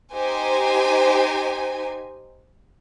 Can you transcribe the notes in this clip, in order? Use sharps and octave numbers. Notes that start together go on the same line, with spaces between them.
D#4 G4 C5 G#5